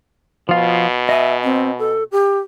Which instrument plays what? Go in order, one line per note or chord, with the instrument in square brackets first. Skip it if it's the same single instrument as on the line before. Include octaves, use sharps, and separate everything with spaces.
[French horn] B2 [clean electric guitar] F3 F4
[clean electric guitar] D#5 G#5 [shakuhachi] E5
[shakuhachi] C4
A4
G4